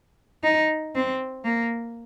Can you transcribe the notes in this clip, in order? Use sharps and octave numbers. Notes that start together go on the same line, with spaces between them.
D#4
C4
A#3